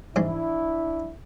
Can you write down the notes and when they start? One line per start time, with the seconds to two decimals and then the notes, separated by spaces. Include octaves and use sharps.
0.16 A1 G#2 G#3 D4 E4